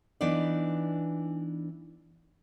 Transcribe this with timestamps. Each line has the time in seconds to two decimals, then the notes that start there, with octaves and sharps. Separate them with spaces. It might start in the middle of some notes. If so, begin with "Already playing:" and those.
0.21 E3 B3 D4 D#4 D5